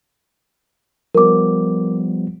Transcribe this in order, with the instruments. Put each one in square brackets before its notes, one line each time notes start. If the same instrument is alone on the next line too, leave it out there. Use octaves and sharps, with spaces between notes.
[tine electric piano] F3 G3 B3 [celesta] A#4 D6